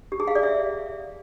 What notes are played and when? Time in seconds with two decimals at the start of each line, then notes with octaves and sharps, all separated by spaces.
0.12 G4
0.20 G#4
0.28 F5
0.35 D5
0.43 E5